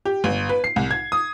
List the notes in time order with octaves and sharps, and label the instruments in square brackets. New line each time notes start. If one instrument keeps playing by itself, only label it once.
[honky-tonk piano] G4
G1
B4
C7
C2
G#6
D#6